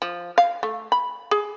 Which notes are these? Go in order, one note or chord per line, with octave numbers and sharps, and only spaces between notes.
F3
F5
A3
B5
G#4